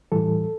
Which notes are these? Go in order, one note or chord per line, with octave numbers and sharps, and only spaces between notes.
A2 E3 G3 A4